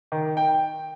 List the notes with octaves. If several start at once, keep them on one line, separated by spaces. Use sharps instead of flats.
D#3
G5